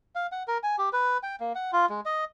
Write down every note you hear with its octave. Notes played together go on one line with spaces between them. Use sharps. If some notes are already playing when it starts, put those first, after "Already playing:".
F5
F#5
A#4
G#5
G4
B4
G5
A#3
F#5
F4
G#3
D#5